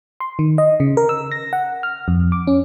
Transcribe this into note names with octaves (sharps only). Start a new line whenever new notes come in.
C6
D#3
D#5
C#3
A#4
E6
A#6
F#5
F6
F2
D6
C#4